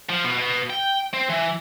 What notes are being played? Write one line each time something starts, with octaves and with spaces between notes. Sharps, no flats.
F3
B2
B2
G5
C4
E3